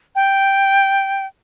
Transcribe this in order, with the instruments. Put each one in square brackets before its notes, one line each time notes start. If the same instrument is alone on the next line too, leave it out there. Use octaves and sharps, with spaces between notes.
[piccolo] G5